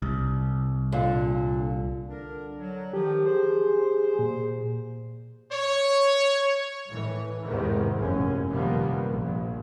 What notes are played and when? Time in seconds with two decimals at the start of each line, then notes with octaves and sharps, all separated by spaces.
0.02 C2
0.92 A#2 D3
2.09 D3 D4 A#4
2.58 F#3
2.93 D#3 F3 G4
3.25 G#4 C5
4.19 A#2
5.52 C#5
6.88 A2 E3
7.43 E2 G#2 C3 D#3 E3
7.93 F1 A#1 F#2 C#4
8.49 C3 D#3 F3 G3 A#3 B3
9.07 A#1